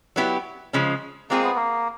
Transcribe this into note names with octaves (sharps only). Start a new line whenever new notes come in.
F#3 B3 E4 G4
C#3 F3 G#3 C#4
G#3 A#3 C4 F4 G#4
B3
A#3